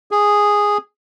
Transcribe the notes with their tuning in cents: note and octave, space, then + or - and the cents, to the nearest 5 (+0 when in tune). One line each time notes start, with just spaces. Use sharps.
G#4 -5